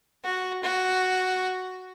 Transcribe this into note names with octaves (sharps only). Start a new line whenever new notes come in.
F#4
F#4